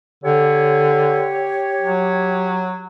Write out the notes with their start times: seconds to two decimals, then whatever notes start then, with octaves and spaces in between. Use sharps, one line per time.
0.24 D3 G4 C#5
1.81 F#3